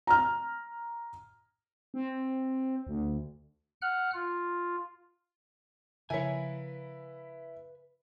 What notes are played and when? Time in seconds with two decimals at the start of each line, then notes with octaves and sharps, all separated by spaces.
0.07 A#5 F6
1.94 C4
2.87 D2
3.82 F#5 F6 F#6
4.14 F4
6.10 C#3 F3 A#3 E4 B4 C#5 G#5